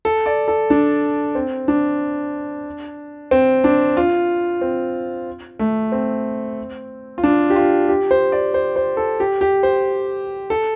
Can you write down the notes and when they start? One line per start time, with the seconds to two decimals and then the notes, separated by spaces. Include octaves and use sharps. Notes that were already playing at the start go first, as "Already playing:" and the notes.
0.05 A4
0.26 D5
0.48 A4
0.70 D4
1.35 C4
1.68 D4
3.31 C4
3.64 D4
3.97 F4
4.61 C4
5.59 A3
5.92 C4
7.18 F4
7.24 D4
7.50 G4
7.56 F4
7.89 G4
8.11 C5
8.32 D5
8.54 C5
8.76 C5
8.97 A4
9.20 G4
9.41 G4
9.63 C5
10.50 A4